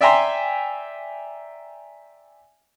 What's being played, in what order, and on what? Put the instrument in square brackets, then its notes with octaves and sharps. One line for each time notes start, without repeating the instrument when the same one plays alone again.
[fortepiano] D5 E5 G5 G#5 A#5 C6